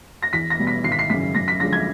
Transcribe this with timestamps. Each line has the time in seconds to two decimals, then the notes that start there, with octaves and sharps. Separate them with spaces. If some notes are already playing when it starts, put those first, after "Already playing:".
0.23 A#6
0.33 E2 B6
0.50 A#6
0.59 B2 G3 B3
0.67 B6
0.84 G#1 C7
0.92 B6
0.99 C7
1.10 F#2 C#3 B6
1.35 F#2 A#6
1.48 B6
1.60 D3 F3 G#3 A#6
1.73 G#6